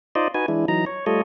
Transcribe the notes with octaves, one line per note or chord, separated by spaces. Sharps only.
D#4 F4 C5 D5 D#5
D#4 F#4 B4 G#5
E3 G#3 D4 E4
E3 F#3 D#4 A#5
C#5
G3 A3 F4 A4 C#5 D#5